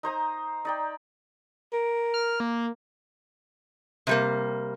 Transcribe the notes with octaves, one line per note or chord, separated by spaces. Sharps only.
D#4 C5 A#5 D#6
D#4 D5 G5
A#4
F6
A#3
C3 G3 A#3